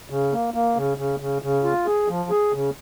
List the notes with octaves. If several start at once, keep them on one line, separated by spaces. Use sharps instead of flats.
C#3
A#3
A#3
C#3
C#3
C#3
C#3
F4
G#4
F3
G#4
C#3